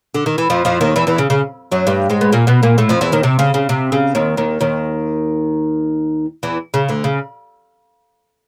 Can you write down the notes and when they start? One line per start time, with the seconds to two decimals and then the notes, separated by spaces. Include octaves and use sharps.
0.14 D3
0.26 D#3
0.38 E3
0.50 F2 F3
0.65 F2 F3
0.81 D#2 D#3
0.96 E2 E3
1.07 E2 E3
1.18 C#3
1.30 C#3
1.72 F#2 F#3
1.87 G2 G3
2.10 G#2 G#3
2.21 B3
2.32 A#2 A#3
2.47 B2 B3
2.63 A#2 A#3
2.78 A2 A3
2.89 F2 F3
3.01 E2 E3
3.12 D#2 D#3
3.23 C3
3.39 C#3
3.54 C#3
3.69 C3
3.92 C#3
4.15 D#2 D#3
4.37 D#2 D#3
4.60 D#2 D#3
6.43 E2 E3
6.74 C#3
6.88 D2 D3
7.04 C#3